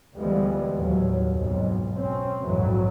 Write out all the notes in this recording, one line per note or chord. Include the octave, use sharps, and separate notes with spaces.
D2 E3 F3 G3 G#3 B3
D#2 A2 F#3
F#1 B1 F2 G#2 B2
C4 C#4
A#1 F2 G#2 E3 F#3